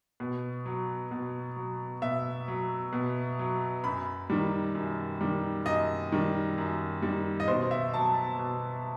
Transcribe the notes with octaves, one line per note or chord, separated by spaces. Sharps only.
B2
F#3
B2
F#3
B2 E5
F#3
B2
F#3
F#2 B5
D#3 G3
F#2
D#3 G3
F#2 D#5
D#3 G3
F#2
D#3 G3
D#5
B2 C5
E5
F#3 A5
B2